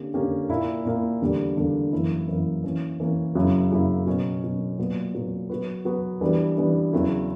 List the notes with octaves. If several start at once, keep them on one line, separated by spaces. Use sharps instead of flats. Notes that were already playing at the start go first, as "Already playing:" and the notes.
Already playing: D3 A#3 C#4 G4
D3 A#3 C#4 G4
A#2 A#3 E4
A#2 A#3 E4
E2 D3 G3 A#3
E2 D3 G3 A#3
F#2 E3 A#3 E4 A#4
F#2 E3 A#3 E4 A#4
E3 A#3 C#4
E3 A#3 C#4
F#2 C#3 F#3 A#3 E4
F#2 C#3 F#3 A#3 E4
B2 F#3 C#4
B2 F#3 C#4
A#2 F#3 B3
A#2 F#3 B3
F#3 B3 F#4 B4
F#3 B3 F#4 B4
E3 G3 B3 D4
E3 G3 B3 D4
E2 C#3 F#3 C#4 E4